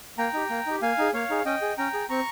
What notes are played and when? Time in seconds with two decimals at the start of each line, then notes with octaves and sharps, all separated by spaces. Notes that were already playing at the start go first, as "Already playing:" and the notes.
0.18 A#3 G5 A#5
0.33 D#4 G4
0.50 A#3
0.66 D#4 G4
0.82 A#3 F5 G#5
0.98 D#4 G#4
1.14 A#3 C#5 F5
1.30 D#4 G#4
1.45 C#4 D#5 G5
1.62 G#4
1.77 C#4 G5 A#5
1.94 G#4
2.09 C4 A#5 C#6